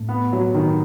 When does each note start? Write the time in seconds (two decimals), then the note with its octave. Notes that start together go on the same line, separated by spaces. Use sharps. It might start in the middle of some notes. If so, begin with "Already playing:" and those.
Already playing: A2
0.09 B3
0.33 F#3
0.54 D#3